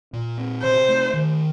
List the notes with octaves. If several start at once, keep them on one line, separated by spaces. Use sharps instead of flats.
A#2
C4
C3 C5
A3
D#3